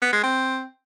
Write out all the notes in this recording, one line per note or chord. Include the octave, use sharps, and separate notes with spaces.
B3
G#3
C4